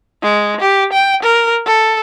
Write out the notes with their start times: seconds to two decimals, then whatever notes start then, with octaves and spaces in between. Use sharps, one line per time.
0.23 G#3
0.61 G4
0.93 G5
1.23 A#4
1.67 A4